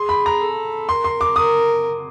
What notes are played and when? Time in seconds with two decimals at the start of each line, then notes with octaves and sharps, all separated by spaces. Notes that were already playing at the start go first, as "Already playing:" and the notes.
Already playing: G#4 C6
0.09 B5
0.26 A#5
0.41 A4
0.88 A#4 C6
1.04 C6
1.21 D6
1.36 A#4 D#6